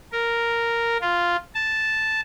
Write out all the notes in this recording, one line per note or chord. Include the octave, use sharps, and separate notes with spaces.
A#4
F4
A5